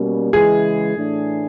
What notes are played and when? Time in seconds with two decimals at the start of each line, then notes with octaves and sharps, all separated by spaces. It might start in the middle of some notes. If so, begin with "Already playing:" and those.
Already playing: B2 G3 A#3 C#4
0.33 C#3 E3 G#3 G#4
0.96 A2 E3 A3 D4